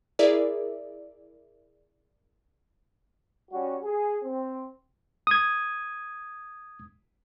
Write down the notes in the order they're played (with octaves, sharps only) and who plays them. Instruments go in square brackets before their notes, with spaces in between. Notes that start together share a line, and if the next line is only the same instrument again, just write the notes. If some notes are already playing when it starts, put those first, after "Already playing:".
[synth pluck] E4 G#4 A#4 D5 E5
[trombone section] G3 C#4 F#4
G#4
C4
[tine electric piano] D#6 G#6